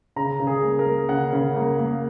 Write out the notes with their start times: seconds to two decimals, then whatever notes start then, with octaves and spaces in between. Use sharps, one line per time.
0.16 C#3 A#5
0.40 C#3
0.47 G#4
0.63 A#3
0.79 A#4
0.86 A#3
1.09 C#3 F#5
1.33 C#3
1.56 A#3
1.79 A#3